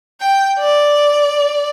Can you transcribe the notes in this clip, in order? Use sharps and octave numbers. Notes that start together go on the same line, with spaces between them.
G5
D5